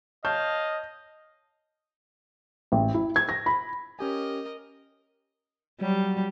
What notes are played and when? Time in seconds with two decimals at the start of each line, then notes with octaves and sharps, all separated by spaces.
0.25 C#5 D#5 F5 A5 G6
2.72 A1
2.94 E4
3.16 G#6
3.29 A#6
3.46 B5
3.99 C#4 G4 A#4 D#5 G#5
5.81 F#3 G3